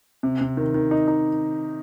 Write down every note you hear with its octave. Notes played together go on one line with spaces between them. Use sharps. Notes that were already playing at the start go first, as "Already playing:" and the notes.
C3
C3
D#3
D#3
D#4
D#4